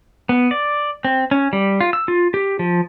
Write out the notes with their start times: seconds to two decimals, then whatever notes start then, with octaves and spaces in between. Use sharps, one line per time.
0.29 B3
0.51 D5
1.05 C4
1.31 C#4
1.53 G3
1.81 F4
1.93 E6
2.08 F4
2.34 G4
2.59 F3